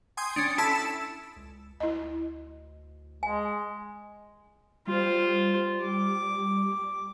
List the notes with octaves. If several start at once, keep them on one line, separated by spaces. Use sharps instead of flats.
G5 G#5 C6 D#6
C#4 D4
E4 A4 A5 B5 E6
C#2
D2 E4 D#5
G#3 G#5
G3 F4 C5
D6